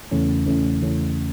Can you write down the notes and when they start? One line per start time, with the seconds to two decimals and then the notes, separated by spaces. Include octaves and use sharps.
0.11 E2 C#3 E3 A3 C#4
0.46 E2 C#3 E3 A3 C#4
0.82 E2 C#3 E3 A3 C#4